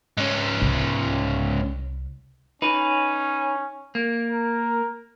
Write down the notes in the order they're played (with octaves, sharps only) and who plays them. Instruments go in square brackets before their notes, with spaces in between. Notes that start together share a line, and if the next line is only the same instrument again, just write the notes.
[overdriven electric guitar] G#2 C#4
[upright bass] C2
[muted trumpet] C#4 [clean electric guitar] D#4 B4
[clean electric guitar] A#3
[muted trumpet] A#4